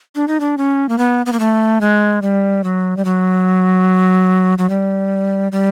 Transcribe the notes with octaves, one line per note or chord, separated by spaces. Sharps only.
D4
D#4
D4
C#4
A#3
B3
B3
A#3
A3
G#3
G3
F#3
G3
F#3
F#3
G3
G3